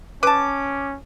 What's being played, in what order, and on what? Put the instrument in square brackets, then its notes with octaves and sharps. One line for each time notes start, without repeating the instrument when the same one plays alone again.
[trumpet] C#4 [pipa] B4 A5 [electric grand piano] D6